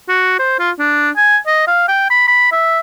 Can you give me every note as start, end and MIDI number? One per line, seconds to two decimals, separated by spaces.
0.08 0.37 66
0.39 0.58 72
0.59 0.71 65
0.79 1.10 62
1.17 1.37 80
1.46 1.64 75
1.68 1.88 77
1.88 2.06 79
2.10 2.27 83
2.28 2.50 83
2.52 2.80 76